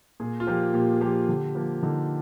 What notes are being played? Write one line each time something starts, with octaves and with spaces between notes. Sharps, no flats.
A#2 G#4
F4
F3 A#3 G4
A#2 G4
G#4
F3 A#3 G4
D3
F3 A#3
D3 D#4